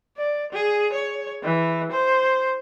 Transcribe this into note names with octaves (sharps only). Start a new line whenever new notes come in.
D5
G#4
C#5
E3
C5